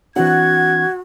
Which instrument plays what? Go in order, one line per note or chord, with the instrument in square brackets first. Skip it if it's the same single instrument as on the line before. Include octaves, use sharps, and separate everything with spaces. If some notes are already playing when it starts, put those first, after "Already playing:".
[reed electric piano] E3 C4 D4 [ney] F#4 [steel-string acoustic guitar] F#5 [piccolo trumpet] G#6